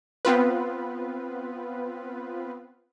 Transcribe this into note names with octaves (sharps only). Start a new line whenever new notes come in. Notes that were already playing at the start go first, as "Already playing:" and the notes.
B3 C4 F4 B4